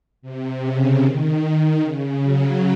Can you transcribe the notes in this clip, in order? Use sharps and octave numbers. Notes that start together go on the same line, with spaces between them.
C3
C#3
D#3
C#3
F#3